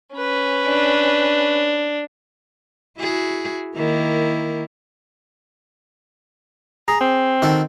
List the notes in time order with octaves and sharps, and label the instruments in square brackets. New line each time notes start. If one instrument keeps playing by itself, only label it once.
[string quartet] C#4 B4
[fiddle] D4
[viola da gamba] E4 F#4 G#4
D#3 A#3 E4
[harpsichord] G#4 [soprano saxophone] A#5
[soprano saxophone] C4
[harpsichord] D#3 F#4 A4